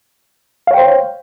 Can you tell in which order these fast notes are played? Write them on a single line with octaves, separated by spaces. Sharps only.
F5 C#5 G5 C5